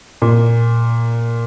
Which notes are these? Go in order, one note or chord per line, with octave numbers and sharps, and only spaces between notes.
A#2